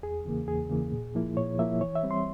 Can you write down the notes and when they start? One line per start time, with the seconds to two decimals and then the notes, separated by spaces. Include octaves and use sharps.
0.03 E2 G#4
0.25 C#3 E3 A#3
0.47 E2 G#4
0.69 C#3 E3 A#3
0.92 A#2
1.15 F3 A#3 E4
1.37 A#2 C#5
1.59 F3 A#3 E4 E5
1.81 E3 C#5
1.96 E5
2.03 G3 C4
2.11 C6